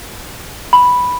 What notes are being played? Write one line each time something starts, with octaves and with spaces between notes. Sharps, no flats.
B5